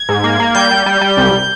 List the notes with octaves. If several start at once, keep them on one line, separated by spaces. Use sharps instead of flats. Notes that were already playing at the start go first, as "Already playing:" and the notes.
Already playing: G#6
G#2
A#3
A#3
G3 G6
G3
G3
G3
C2